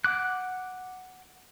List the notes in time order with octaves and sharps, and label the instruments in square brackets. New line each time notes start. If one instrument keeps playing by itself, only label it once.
[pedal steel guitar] F#5 D6 F#6